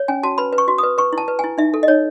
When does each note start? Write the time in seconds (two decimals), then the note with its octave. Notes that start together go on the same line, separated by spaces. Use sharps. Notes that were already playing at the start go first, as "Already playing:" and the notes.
Already playing: C#5
0.08 C#4 G#5
0.23 F#4 A5
0.38 B4 B5
0.53 B4
0.58 C#6
0.68 F#4
0.78 B4 D#6
0.98 B4 C#6
1.13 E4
1.18 A5
1.28 B4
1.39 E4 G#5
1.58 D#4 E5
1.74 A4
1.83 D#5
1.88 D#4 C#5